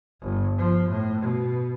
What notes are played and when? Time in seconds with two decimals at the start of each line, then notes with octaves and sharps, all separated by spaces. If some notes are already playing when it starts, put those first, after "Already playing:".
0.22 G1
0.58 F3
0.89 A2
1.20 B2